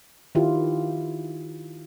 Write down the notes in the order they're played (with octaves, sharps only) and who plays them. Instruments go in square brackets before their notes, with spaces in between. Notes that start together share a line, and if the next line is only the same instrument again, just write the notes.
[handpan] D#3 E4 F4 G4